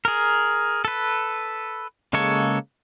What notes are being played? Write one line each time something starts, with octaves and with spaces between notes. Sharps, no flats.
G#4 A#4
A4 B4
C#3 G#3 A#3 A4 C#5